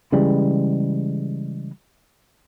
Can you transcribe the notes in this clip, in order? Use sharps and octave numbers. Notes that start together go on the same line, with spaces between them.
C#3 E3 G3 G#3